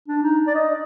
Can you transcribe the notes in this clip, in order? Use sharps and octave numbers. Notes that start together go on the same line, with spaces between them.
D4
D#4
D5
D#5